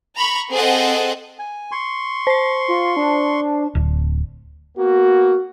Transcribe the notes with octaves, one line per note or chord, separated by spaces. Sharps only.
A#5 B5 C#6
C4 G#4 A4 C5 D#5 F#5
G#5
C6 C#6
C5 C7
F4
D4
D1
A#3 B3 F#4